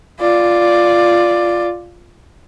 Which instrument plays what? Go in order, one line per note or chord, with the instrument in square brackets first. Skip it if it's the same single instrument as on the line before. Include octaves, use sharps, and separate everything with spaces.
[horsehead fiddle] F4 D5